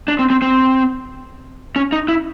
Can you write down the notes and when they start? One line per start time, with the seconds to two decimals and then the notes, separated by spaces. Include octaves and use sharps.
0.08 D4
0.19 C4
0.30 C4
0.42 C4
1.76 C#4
1.92 D#4
2.08 E4